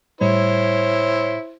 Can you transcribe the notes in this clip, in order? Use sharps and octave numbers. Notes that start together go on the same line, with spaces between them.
A2 G3 E4 C5 C#5